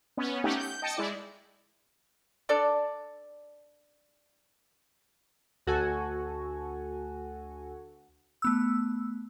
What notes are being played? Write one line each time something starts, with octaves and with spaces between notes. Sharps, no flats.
B3 C#4
A3 C#4 D#4 G4 F#5
G6
D#5 G5 A5 C#7
G#3 E4 D5
D4 A4 D5
D2 F#4 A4 G#5
A3 B3 E6